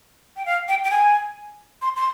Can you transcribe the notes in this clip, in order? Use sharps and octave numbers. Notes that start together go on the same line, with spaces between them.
G5
F5
G5
G5
G#5
C6
C6